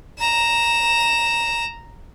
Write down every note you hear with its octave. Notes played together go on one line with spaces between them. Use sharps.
A#5 E7